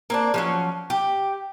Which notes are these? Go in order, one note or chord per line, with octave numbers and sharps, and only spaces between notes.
A#3 C4 D4
F3 F#3 C#4
G4